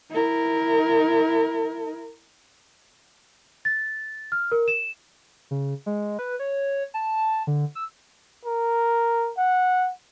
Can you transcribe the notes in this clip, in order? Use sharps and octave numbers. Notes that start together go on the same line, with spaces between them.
E4 A#4
A6
F6
A#4
E7
C#3
G#3
B4
C#5
A5
D3
E6
A#4
F#5